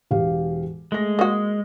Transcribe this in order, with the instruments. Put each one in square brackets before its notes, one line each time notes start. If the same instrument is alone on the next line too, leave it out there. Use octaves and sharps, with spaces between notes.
[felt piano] E1 G4 F5
[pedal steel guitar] G#3 [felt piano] A3 G#4 A#6
[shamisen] A#3 F#4 [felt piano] D#6